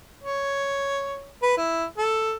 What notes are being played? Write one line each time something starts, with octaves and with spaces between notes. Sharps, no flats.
C#5
B4
E4
A4